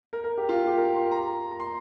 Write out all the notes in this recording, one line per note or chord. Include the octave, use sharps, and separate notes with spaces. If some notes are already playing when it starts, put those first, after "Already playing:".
A#4
A#4
G4
F4
G4
A#4
C6
A#5
A#5
C6